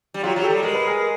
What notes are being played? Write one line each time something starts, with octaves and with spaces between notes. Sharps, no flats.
G3
F#3 F4 G4
F#3
G4 A4
G3
G#3 A#4
B4
G#4 A#4